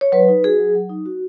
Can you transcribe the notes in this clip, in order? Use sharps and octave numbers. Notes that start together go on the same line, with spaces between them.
C#5
F#3 B4
D#4
F#4 G#4
F#3
F#3
D#4
F#4